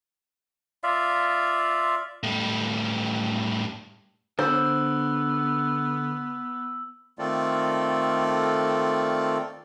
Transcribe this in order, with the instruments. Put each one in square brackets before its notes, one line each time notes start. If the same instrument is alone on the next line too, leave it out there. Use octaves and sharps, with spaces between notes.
[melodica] F4 D5 E5 F5
[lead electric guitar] A2 G3
[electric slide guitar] D3 [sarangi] B3 [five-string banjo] C5 [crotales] E6
[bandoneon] D#3 A3 C4 F4 A4 D5